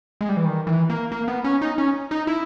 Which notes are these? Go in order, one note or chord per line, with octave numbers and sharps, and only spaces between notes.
G#3
G3
E3
D#3
E3
A#3
A#3
B3
C#4
D#4
C#4
D#4
E4